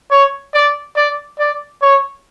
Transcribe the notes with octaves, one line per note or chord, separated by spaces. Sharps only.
C#5
D5
D5
D5
C#5